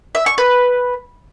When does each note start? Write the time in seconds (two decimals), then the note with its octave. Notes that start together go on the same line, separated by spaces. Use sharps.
0.15 E5
0.26 C#6
0.38 B4